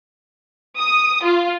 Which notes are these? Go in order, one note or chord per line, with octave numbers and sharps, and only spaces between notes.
D#6
F4